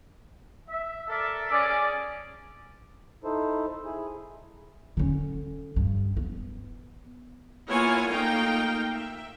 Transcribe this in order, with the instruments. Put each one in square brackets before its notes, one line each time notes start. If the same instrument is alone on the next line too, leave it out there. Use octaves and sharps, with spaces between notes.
[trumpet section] E5
A4 A#4 D5 E5
C#4 G#4 D5
[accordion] D#4 E4 A4 C5
E4 G#4
[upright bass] D3 C#4
G2
B3
[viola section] A#3 B3 E4 F4 C#5 G#5
A3 A#3 D#4 F4 F5 G5
E5